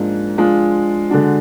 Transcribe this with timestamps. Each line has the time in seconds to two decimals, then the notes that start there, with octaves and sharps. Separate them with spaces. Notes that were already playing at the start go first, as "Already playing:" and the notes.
Already playing: G#2 F3 A#3 D4
0.37 F3 G#3 D4 F4
1.10 D3 G#3 D4 F#4